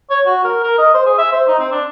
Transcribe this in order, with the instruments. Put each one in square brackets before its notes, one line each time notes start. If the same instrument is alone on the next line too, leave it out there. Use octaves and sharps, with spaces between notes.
[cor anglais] C#5
F#4
A#4
A#4
D#5
C5
G#4
E5
C5
D#4
C4
D4